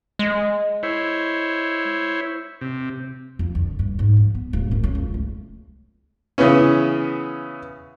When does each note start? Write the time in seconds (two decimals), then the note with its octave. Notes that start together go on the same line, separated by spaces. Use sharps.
0.19 G#3
0.83 E4 C5 C#5
2.61 C3
3.39 F2
3.55 D3
3.79 G2
3.99 G#2
4.17 F3
4.35 B3
4.53 D1
4.71 F#2
4.84 C#4
4.95 C#2
5.14 A3
6.38 C#3 E3 B3 C#4